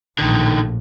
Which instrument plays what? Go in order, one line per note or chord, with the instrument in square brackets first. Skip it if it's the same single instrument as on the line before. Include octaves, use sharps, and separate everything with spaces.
[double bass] A#1 A2 [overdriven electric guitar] D3 D#3